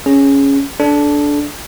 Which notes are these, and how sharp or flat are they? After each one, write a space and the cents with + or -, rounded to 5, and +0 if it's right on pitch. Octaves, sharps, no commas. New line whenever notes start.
C#4 +0 G#4 +0
D4 -10 A4 -25